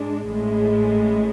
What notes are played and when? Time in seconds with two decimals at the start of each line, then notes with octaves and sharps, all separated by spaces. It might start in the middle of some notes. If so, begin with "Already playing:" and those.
Already playing: G#2 G#3 D4
0.30 A1 A2 G#3